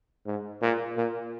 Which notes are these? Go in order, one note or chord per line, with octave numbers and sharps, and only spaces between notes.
G#2
A#2
A#2